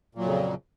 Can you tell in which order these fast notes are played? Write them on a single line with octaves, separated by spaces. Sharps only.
A#2 F#3 F2 C#3